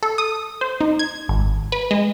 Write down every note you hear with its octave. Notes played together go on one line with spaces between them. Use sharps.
A4
D#6
C5
D#4
G#6
G#1
B4
G#3